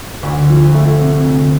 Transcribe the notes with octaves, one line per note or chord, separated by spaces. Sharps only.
D2
F3
A3
C3
D2